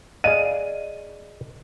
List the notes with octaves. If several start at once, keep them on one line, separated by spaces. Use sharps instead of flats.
G#4 D5 D#5 F5 D#7